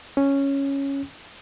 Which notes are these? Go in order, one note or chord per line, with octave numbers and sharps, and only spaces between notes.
C#4